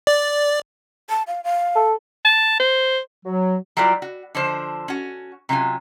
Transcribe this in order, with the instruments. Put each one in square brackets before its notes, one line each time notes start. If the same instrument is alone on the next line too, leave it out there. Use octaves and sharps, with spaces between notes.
[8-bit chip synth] D5
[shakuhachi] A5
F5
F5
[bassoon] A4
[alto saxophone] A5
C5
[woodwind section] F#3
[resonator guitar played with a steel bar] F#3 G3 E4 F4 A#4 D5
F#4
D3 F3 D4 C5
C#4 F#4
C3 F#3 C#4 F4 G#5